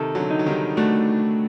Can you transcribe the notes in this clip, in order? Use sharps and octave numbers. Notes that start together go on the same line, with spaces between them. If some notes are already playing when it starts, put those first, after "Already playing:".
Already playing: C3 D#3 A4
D3 F#3
D#4
F#3
D#3 G3
A3 D4 F#4